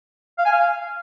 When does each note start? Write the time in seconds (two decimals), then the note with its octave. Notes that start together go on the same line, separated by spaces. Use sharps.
0.38 F5
0.45 G#5
0.52 F5